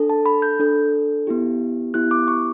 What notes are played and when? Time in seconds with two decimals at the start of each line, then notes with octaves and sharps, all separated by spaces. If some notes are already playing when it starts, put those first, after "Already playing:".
Already playing: D4 A4
0.10 A5
0.26 B5
0.42 G6
0.60 D4 A4
1.27 B3 E4 G4
1.94 B3 E4 G4 F#6
2.11 D6
2.28 C#6